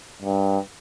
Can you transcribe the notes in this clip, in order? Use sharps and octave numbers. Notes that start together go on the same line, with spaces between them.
G2